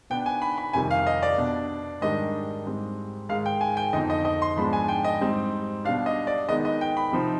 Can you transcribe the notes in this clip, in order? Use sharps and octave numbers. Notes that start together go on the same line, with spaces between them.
B2 B3 D4 G5
G#5
B5
B5
F2 C3 D#3 G3 G#5
F5
D#5
D5
B2 B3 D4
G#2 D#3 G3 D4 D#5
G#2 G3 C4
G#2 D#3 G#3 F5
G5
G#5
G5
F2 D3 F3 B3 D#4 D#5
D#5
D#5
C6
G#2 F3 G#3 B3 D4 B5
G#5
G5
D#5
G#2 G3 C4 D#4
B2 G3 D4 F5
D#5
D5
D#3 G#3 B3 D#4 D#5
D#5
G5
B5
C3 F3 C4 D#4